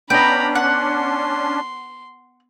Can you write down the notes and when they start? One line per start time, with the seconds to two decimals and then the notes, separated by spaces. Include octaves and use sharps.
0.10 B3 C#4 D4 D#5 G5 A#5 B5
0.55 F#5 C6